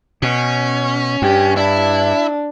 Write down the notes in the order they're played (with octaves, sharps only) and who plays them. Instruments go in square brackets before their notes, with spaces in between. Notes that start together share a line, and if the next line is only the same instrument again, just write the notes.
[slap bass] B2 [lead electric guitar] C#4
[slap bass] G2 [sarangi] G4
[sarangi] D4 [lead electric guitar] E4